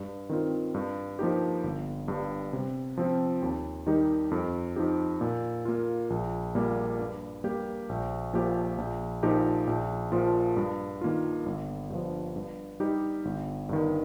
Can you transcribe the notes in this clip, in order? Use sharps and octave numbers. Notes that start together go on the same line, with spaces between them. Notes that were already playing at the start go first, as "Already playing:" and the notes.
Already playing: G2
D#3 C4 F4
G2
F3 A#3 D#4 G4
G1
G2 G3
C3
F3 C4 F4
D#2
D#3 G3 D#4 G4
F2
F3 D#4 G4
A#2
A#3 F4
A#1
A#2 G3 A#3
G2
G3 A#3 G4
A#1
A#2 F3 A#3 G4
A#1
A#2 F3 D#4 G4
A#1
A#2 F3 A#3 F4
G2
D#3 A#3 F4
G1
G2 F3
G2
G3 D#4 G4
G1
G2 D#3